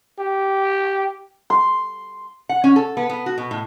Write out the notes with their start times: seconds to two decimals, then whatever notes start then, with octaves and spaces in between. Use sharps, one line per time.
0.19 G4
1.50 C6
2.49 F#5
2.64 C#4
2.76 A4
2.97 B3
3.10 B3
3.26 F#4
3.38 B2
3.51 A2